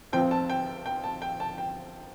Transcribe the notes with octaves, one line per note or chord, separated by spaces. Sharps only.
F1 F2 F3 C4 G5
A5
G5
G5
A5
G5
A5
G5